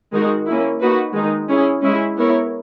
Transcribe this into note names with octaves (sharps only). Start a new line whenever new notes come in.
D#3 G#3 D#4 F#4 A#4
A#3 C#4 E4
A#3 D#4 F#4 B4
D#3 G#3 D#4
C#4 E4 G#4
G#3 C#4 E4
B3 E4 A#4 C#5